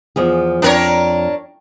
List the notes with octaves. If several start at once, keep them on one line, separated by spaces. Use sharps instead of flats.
E2 F3 G#4
F2 D4 A#4 C#5